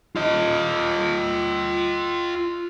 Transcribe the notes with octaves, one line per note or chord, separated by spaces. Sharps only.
F4 D#5